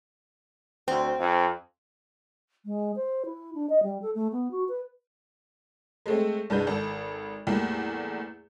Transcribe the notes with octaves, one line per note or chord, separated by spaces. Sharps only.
D2 C4
F2
G#3
C5
E4
D4
D#5
G3
A4
A3
B3
F#4
B4
G#3 A3 C4
C2 G2 G#3 B4 G6
G#1 A4
E2 A2 G3 A#3